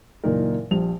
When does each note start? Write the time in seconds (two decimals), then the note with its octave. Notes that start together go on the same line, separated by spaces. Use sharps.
0.24 F#1 A#2 E3 D#4 A#4
0.71 A#1 F3 G3 F7